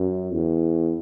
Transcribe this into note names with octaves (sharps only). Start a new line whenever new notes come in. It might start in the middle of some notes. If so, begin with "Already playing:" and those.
Already playing: F#2
E2